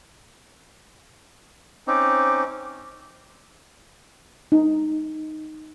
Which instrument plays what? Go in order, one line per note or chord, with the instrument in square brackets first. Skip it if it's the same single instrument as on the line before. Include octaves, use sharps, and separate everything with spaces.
[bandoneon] C4 C#4 D#4 [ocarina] D6
[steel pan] D#4